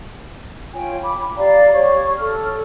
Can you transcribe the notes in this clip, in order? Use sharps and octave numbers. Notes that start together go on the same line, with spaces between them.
F4 C#5 G5 G#5
B5 D6
G4 D5 F5 A#5
G4 C#5 C#6
A4 F6